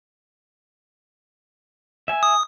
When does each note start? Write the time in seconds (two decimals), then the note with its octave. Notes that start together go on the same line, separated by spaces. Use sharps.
2.08 E5 G#5
2.23 D#6